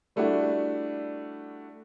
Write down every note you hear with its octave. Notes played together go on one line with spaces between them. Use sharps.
G3 A3 D4 E4 F#4